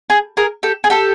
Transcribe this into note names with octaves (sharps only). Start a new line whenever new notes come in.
G#4
G#4 A#4
G4 A4
G#4
G4 A4